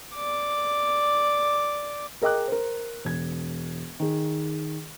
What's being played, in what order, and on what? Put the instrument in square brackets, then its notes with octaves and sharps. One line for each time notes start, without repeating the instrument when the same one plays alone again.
[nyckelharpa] D5 D6
[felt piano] G#4 A#4 D#5 G5 D6 F#6
A#4 C5
E1 G#6
D#3 G#4